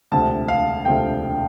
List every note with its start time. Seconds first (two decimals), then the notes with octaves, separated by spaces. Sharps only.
0.12 E1 D2 C3 F3 A3 A5
0.48 F5
0.85 E1 D2 C3 F3 A3 G5